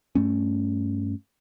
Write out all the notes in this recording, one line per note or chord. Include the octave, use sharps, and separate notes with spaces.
G2 A3 C#4